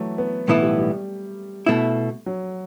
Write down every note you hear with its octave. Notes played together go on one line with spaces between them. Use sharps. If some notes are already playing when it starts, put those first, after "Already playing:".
Already playing: E3 F#3 A3
B3
B1 A2 E3 A3 B3 E4
G3
G3
B2 A3 E4
F#3